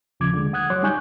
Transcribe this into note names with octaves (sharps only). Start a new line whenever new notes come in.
D#2 C#3 F3 D6 G#6
D3 G#3
F#5 D#6 F#6 G#6
F#3 C#5 C6 D6
G3 D#4 G#5 C#6 F#6 G6